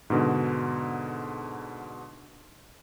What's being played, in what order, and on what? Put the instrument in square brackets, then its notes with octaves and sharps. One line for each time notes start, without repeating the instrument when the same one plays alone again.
[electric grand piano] G#2 B2 D3